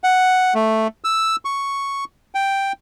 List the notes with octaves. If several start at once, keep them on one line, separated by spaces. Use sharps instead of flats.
F#5
A3
E6
C#6
G5